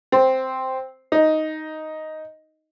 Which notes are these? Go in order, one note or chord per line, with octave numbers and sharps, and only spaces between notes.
C4
D#4